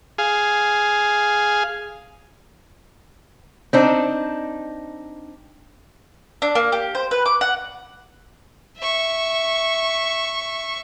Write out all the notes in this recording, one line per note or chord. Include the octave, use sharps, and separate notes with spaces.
G#4 F5
C4 D4 D#4
D4
A#3
G4
C5
B4
D6
F#5
E5 C#6